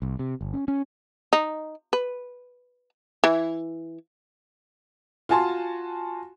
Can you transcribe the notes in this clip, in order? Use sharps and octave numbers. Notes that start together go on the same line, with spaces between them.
C2
C3
G1
C#4
C#4
D#4
B4
E3
F4 F#4 G#5 A5 C6